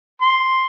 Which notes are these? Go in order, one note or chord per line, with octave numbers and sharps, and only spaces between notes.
C6